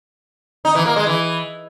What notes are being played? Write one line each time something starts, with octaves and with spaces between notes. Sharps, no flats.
D#4
E3
A#3
G#3
E3